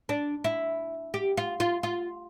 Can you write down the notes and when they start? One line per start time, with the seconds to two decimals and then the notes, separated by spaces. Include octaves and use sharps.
0.09 D4
0.44 E4
1.14 G4
1.37 F4
1.60 F4
1.83 F4